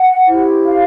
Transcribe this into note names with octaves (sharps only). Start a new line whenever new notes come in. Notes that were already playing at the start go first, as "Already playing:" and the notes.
Already playing: F#5
E4 G4 C5
F5